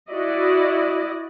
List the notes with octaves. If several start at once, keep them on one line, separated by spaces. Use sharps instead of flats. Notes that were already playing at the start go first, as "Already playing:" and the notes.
E4 F#4 D5 D#5